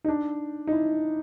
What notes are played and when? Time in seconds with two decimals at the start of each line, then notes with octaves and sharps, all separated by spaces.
0.04 D#4
0.08 D4
0.67 D#4
0.72 E4